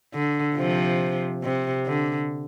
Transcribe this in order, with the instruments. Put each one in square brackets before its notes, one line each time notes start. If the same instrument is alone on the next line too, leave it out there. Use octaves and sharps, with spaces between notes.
[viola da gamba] D3
C3 F3
C3
D3